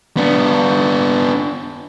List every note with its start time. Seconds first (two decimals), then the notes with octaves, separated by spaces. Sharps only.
0.17 B3 D4